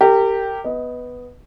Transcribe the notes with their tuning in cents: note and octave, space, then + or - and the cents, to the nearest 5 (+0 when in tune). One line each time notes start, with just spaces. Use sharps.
G4 +0 A#4 -30
B3 +0 D#5 +20